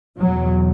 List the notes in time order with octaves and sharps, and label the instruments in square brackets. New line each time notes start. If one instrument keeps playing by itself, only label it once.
[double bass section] E2 B2 F#3